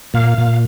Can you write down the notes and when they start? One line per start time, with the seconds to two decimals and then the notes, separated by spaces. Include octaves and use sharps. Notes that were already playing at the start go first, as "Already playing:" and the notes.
0.14 A#2 F5
0.38 A#2